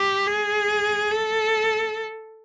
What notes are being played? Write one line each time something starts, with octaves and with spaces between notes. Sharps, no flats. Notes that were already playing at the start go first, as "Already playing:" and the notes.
Already playing: G4
G#4
A4